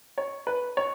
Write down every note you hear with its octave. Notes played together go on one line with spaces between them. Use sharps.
C#5
B4
C#5